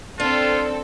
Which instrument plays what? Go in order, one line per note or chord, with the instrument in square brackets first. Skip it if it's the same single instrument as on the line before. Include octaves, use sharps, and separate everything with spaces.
[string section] C4 A4 [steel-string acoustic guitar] D4 [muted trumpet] F4